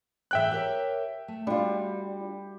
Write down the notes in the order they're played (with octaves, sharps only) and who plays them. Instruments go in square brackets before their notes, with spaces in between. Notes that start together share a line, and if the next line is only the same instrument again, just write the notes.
[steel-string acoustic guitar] D2 G#2 E3 [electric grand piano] E5 G5 F#6
[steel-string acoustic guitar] G4 A#4 C#5
A3
[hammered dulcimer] G3 [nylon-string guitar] D4 F4 [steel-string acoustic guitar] F#4